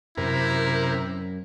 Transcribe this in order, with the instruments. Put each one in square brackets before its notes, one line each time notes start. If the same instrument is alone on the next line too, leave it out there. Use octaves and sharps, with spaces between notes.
[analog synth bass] F#2 [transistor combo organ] C3 A#4 [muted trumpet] E4